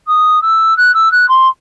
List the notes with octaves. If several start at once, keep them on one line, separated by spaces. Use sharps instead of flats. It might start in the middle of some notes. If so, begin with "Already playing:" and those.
D#6
E6
F#6
E6
F#6
C6